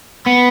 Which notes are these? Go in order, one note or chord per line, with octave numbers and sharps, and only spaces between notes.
B3